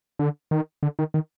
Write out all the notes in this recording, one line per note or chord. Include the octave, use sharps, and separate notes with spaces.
D3
D#3
D3
D#3
D#3